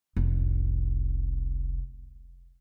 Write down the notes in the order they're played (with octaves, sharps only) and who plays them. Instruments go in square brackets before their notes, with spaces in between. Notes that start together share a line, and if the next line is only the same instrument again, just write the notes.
[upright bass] F1 C2